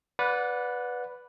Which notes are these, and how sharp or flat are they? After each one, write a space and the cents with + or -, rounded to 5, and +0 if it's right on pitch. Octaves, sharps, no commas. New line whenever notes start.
B4 +0 D5 -15 F#5 -25